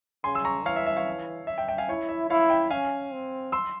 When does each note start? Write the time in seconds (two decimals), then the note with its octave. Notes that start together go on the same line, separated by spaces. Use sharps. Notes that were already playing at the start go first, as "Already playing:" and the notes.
0.24 C#3 G#5 C6
0.35 C6 E6
0.44 A#5 C#6
0.65 E3 C#5 F5
0.76 E5
0.86 E5
0.97 C#5 F5
1.47 E5
1.58 E5 G5
1.68 E5 G5
1.78 F5 G#5
1.89 E4 C#5
2.09 E5
2.30 E4 C#5 F5
2.50 E5 G5
2.70 C#4 F5 G#5
3.12 C4
3.52 C6 E6